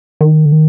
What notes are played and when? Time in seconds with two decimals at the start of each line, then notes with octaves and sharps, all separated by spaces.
0.21 D#3
0.46 D3
0.52 D#3